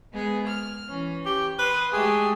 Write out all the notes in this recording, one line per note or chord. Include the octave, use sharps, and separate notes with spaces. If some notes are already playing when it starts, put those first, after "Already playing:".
G#3 B3 G#4
F6
E3 C#4
G4
B4 C6 D#6
G#3 A3 G4 G#4